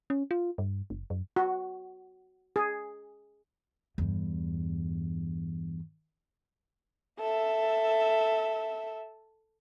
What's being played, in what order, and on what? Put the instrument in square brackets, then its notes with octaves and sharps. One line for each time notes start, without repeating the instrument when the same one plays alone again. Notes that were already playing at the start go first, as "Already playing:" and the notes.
[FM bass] C#4
F4
G2
F#1
F#2
[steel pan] F#4
G#4
[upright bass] E2 G2
[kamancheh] A4 E5